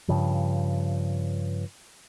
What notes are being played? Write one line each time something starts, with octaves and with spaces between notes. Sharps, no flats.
G2 C#3 F3